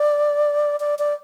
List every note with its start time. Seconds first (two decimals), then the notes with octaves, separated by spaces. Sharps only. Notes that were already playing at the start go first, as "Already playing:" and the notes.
Already playing: D5
0.80 D5
0.99 D5